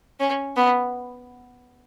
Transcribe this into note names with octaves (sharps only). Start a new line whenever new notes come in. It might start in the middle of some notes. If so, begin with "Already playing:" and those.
C#4
B3